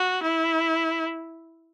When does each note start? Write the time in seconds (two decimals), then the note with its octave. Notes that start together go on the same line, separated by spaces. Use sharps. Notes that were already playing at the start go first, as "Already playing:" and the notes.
Already playing: F#4
0.22 E4